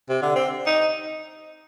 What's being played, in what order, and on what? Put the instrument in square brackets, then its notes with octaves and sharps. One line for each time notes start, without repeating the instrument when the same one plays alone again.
[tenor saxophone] C3
D3
C4
D#4